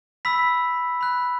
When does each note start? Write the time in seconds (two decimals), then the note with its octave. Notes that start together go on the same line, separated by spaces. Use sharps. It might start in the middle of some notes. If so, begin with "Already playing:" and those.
0.25 B5 E6 B6
1.01 B5 F#6